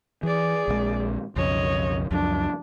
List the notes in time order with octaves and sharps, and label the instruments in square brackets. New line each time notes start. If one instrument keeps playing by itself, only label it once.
[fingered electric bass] E3 [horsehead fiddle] G#4 D5
[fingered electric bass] A#1 D#3 G#3
[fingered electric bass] B1 F2 C#3 [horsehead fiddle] C#5 D#5
[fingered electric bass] C#2 F#2 F3 [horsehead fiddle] D4